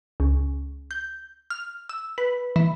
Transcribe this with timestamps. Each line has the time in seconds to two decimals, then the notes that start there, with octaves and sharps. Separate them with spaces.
0.20 C#2
0.91 G6
1.50 F6
1.89 E6
2.18 B4
2.56 E3